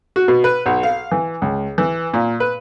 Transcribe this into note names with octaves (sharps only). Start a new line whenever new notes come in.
F#4
B2
B4
B1
F5
E3
C#2
E3
A#2
B4